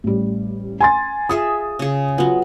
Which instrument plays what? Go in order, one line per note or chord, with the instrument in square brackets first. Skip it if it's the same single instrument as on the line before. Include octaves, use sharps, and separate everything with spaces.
[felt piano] A1 G3
G#5 C6 A6
[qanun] F4 G#4 E5 [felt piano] D#6
[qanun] C#3 G#4
[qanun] F#3 B3 [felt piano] F4